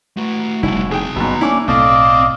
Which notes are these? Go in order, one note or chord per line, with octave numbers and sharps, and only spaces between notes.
A3 F#4 B4
F1 B2 G3 A3 E4
D#4 G#4 G5 A5
G1 B2 F#3 G#3 B5
A#3 B3 C#4 D4 E4 D6
B1 A2 A3 C4 D5 D#5 F5